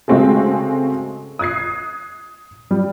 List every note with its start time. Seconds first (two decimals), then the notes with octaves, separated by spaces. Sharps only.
0.08 C#3 G#3 A3 C4 F#4 G#4
1.39 D#6 F#6 G#6 C7
2.71 G3